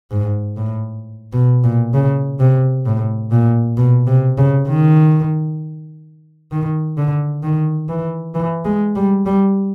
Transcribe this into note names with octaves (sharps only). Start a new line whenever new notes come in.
G#2
A2
B2
A#2
C#3
C3
A2
A#2
B2
C3
C#3
D#3
D#3
D3
D#3
E3
E3
G#3
G3
G3